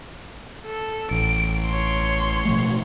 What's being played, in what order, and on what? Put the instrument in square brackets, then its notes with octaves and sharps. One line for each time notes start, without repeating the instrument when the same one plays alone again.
[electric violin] A4
[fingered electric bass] A1 [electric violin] D7
[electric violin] C#5 C6
[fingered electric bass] B2 F3 A3